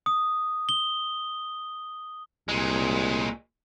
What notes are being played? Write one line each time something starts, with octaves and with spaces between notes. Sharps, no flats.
D#6
G7
C2 A#2 G#3